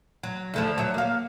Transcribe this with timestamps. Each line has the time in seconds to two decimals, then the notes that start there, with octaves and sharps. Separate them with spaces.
0.23 F#3
0.54 D2 D3 F3
0.78 F#3 C#5 E5
0.94 A#3 F5